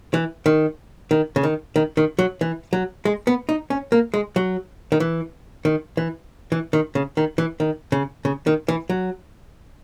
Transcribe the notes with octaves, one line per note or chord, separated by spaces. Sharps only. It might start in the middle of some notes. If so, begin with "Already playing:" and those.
E3
D#3
D#3
C#3
D#3
D#3
D#3
F#3
E3
F#3
G#3
B3
D#4
C#4
A#3
G#3
F#3
D#3
E3
D#3
E3
E3
D#3
C#3
D#3
E3
D#3
C#3
C#3
D#3
E3
F#3